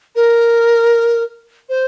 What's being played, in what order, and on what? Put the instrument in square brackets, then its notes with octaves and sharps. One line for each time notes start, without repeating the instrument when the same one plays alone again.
[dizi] A#4
C5